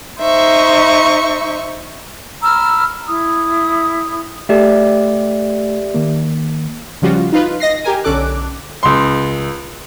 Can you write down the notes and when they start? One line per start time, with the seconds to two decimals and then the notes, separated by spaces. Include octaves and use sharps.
0.21 D#4 C5 E5 C#6
2.41 A#5 B5 E6 F6
3.07 E4 D#6
4.49 A3 G4 A4 D5 E5
5.94 D#3 A#3
7.02 C#3 F3 G3 F4 F#4
7.32 D#4 F4 B4
7.60 D#5 A#6 C7
7.84 G4 A#4 G#5
8.04 B1 D3 C#4 A4 D6 F#6
8.83 C#2 C6